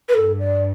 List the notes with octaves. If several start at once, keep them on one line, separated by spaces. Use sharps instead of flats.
B4
G2 A4
D5